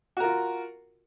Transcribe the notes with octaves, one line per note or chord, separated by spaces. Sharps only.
F4 F#4 A#4